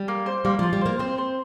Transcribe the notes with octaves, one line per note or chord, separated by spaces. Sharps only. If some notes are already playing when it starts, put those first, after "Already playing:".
Already playing: G3
A#3
C5
G3 A#3
F3 F4
G3
A#3 C5
C4 C5
C5